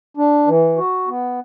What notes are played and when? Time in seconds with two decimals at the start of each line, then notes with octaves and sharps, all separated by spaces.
0.17 D4
0.47 E3
0.77 F#4
1.08 B3